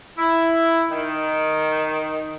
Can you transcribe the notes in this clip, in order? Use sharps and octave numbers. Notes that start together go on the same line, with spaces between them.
E4
D#3